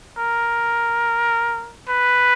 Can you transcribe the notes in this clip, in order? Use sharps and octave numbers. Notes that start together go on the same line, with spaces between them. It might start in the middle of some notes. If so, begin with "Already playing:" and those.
A#4
B4